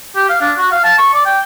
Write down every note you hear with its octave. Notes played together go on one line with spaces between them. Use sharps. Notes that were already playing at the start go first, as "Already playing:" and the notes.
G4
F5
D4
F#4
F5
A5
C#6
D5
G5